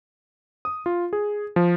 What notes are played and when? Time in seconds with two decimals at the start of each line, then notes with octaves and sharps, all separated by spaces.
0.65 D#6
0.86 F4
1.13 G#4
1.56 F3